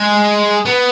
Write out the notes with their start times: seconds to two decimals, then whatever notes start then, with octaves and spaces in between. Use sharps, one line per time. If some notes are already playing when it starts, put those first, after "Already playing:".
Already playing: G#3
0.65 B3